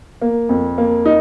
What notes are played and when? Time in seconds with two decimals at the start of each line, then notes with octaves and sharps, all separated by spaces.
0.22 A#3
0.49 F2
0.78 A#3
1.06 D#4